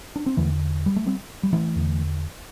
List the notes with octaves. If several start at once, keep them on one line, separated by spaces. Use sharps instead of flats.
D4
C4
E2 D3 E3 A3
G3
A3
G3 C4
G3
E3 A3
E2 D3